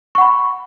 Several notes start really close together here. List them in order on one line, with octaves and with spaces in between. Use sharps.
C#6 F#5 B5